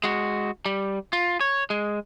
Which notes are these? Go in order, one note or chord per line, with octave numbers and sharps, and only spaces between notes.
G#3 F#4
G3
F4
C#5
G#3